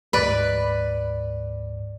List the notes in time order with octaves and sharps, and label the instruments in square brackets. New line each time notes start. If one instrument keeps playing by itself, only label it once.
[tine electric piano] D2 G#2 [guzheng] B4 D5